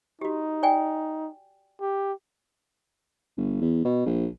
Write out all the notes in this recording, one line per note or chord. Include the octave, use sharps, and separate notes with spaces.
D#4 F#4 G4
D5 G5 G#5
G4
G1
E2
B2
A#1